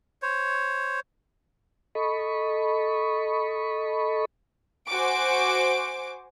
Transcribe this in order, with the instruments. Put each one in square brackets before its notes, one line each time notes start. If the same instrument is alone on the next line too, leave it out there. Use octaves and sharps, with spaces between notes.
[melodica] C5 C#5
[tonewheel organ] A4 D#5 B5 C#6
[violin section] F#4 C5 G#5 D6 D7